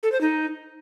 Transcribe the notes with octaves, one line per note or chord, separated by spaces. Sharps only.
A4
C5
D#4